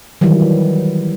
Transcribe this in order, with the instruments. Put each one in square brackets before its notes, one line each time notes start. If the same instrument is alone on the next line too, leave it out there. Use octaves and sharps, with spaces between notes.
[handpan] D#3 E3 F#3 G3